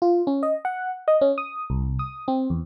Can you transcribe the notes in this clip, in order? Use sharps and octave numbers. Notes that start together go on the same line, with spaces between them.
F4
C#4
D#5
F#5
D#5
C#4
D#6
C2
D#6
C4
E2